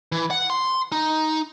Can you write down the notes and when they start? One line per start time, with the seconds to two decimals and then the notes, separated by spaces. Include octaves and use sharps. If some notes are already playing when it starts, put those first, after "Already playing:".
0.12 E3
0.31 F#5
0.50 C6
0.92 D#4